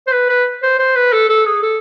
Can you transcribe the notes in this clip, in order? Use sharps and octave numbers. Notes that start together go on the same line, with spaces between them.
C5
B4
B4
C5
C5
B4
A4
A4
G#4
A4